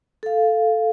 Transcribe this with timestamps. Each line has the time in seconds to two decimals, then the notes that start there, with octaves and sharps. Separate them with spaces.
0.23 A4 F5